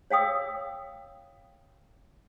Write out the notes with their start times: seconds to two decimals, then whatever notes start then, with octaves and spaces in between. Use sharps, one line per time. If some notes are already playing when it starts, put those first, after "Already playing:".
0.10 C#5 F5 G5 D#6 E6